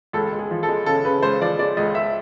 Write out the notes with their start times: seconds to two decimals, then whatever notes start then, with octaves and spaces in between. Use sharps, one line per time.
0.13 C#2 A4
0.32 G#3
0.39 G#4
0.51 F3
0.63 A4
0.69 G#3
0.86 C#3 A4
1.05 C#3 B4
1.23 C#2 C5
1.41 F3 D5
1.59 G#3 D5
1.77 C#2 D#5
1.95 G#3 E5